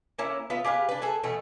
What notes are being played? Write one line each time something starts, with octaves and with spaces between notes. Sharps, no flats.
A#3 C#4 E4
B3 F4 B4 E5
G4 G#4 B4 F5
D4 B4
G#4 A4 F#5 G#5
B2 E3 A3 B3